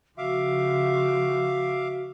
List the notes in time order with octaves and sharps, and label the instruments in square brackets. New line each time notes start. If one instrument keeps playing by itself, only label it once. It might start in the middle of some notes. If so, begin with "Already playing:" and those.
[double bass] C#3 F3 [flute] F#4 [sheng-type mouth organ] E5 F5 D6